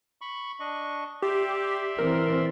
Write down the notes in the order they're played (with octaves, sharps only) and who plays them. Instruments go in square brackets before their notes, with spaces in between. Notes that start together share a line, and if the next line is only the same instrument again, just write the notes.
[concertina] B5 C#6
D4 D#5 C#6
[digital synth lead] G4 [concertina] D5 E5 C6
[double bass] E3 C4 [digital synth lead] A#4